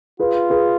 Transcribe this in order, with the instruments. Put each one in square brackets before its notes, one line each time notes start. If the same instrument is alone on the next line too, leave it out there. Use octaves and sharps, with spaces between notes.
[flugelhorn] F4 [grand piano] G#4 B4
[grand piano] G#4 B4